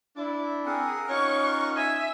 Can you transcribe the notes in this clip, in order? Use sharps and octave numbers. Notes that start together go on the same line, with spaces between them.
D4 E4
C4 G#4 A#4 F#5
C#4 D#4 F4 C#5 C#6
E5 G#5